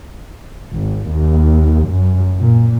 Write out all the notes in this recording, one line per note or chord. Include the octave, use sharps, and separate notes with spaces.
G#1
D#2
F#2
A#2